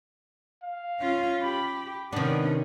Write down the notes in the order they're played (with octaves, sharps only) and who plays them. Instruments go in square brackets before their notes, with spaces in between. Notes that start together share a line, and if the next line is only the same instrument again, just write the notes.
[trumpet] F5
[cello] C#4 F4
[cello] G4 [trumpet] B5
[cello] C3 C#4 [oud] D#3 D4 [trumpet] B3